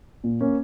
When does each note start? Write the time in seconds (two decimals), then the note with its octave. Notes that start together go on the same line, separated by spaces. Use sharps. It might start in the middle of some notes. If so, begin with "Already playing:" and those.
0.24 A#2
0.41 A#3 C#4